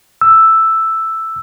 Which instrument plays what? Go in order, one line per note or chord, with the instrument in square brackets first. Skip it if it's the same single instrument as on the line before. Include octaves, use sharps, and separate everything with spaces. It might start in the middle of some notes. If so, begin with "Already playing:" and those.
[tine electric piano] E6